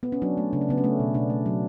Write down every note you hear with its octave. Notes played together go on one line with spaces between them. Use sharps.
B3
C#4
F#3 D4
A3
C#3 D4
C#4
C#3 B3
C#4
A3
B2
B2 D4
A3
F#3